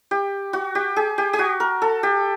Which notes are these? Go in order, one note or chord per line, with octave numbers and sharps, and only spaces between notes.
G4
F#4
G4
G#4
G4
G4
F#4
A#4
A4
G4